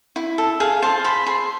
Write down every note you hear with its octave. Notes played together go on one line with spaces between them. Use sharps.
E4
A4
G#4 F5
C5 A5
C5 B5
G#4 C6